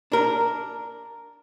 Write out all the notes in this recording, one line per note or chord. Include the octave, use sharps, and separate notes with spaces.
D4 A#4